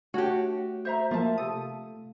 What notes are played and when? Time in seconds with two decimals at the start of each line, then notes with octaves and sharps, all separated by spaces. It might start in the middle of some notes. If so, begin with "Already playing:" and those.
0.14 A3 F#4 G4 C#5 F#5
0.85 C5 E5 A#5
1.11 F3 A#3 F4 E5 A5
1.38 C3 A4 D#6